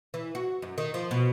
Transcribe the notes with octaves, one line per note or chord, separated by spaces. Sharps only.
E3
F#4
F#2
D#3
F3
B2